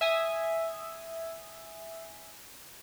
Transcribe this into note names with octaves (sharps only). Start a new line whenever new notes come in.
E5 G#5 D#6